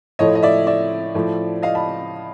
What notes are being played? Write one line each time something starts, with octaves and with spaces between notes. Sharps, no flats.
A2 F3 A3 C#5 D#5
D#5
D5 E5
D5 E5
A2 F3 A3
D#5 F5
A5 B5